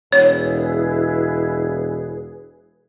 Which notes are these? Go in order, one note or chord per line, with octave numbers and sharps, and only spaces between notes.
E1 E4 G#4 B4 C#5